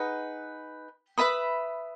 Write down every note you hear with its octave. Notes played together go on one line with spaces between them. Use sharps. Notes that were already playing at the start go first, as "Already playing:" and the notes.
Already playing: D#4 G#4 B4 F#5
B4 E5 B5 D#6